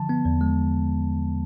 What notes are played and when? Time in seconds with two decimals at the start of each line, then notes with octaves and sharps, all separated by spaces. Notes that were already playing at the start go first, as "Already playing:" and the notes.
Already playing: D3 F3 A5
0.09 B3
0.25 E2
0.41 G#3